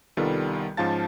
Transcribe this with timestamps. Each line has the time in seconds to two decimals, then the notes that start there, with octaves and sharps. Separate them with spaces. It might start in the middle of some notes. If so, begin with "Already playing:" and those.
0.17 C2 D#3 G3 B3 F4 A4
0.77 G#2 F3 C#4 F5 A5 A6